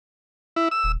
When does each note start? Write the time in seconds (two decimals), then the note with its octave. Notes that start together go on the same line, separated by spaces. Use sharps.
0.56 E4
0.71 E6
0.84 D#1